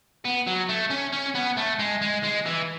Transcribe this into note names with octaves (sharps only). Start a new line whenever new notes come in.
B3
F#3
A3
C#4
C#4
B3
A3
G#3
G#3
G#3
E3